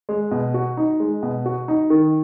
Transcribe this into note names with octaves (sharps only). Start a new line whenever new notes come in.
G#3
B2
F#4
D#4
G#3
B2
F#4
D#4
D#3